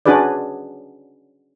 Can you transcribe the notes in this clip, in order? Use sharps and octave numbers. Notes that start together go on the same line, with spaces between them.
C#4 D4 F#4 G#4 B4 D5